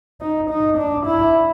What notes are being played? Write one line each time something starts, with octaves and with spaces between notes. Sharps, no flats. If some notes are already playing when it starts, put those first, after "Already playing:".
D#4
D#4
D4
E4